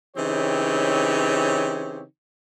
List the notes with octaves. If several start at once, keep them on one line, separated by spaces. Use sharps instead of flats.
C#3 E3 C4 D#4 G4 C#5